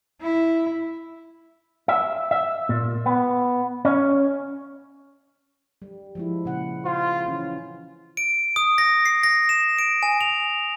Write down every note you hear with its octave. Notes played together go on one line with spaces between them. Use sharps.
E4
E5
E5
A#2
B3
C#4
G3
F3 G#3 E4
A#2 C#3 F#5
F4 C5
E3 C#4
D7
D#6
A#6
C7
A#6
E7
D7
G#5
F7